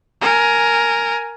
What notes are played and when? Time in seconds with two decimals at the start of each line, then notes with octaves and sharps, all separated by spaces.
0.21 A#4 G#5